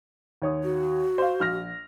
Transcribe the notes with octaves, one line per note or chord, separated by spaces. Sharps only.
D#2 C#5 D#6
F#4
C5 F5
A#1 F6 A#6